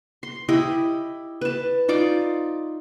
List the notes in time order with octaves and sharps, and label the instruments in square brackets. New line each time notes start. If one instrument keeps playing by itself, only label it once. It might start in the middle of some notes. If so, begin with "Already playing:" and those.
[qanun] C6
E4 G4 D#5 B5
B4 A5
D#4 F4 D5 D6